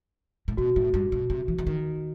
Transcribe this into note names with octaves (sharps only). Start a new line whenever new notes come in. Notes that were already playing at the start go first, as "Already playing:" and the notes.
A2
B2 F#4
A2
G2
B2
C3
E3
E3
D#3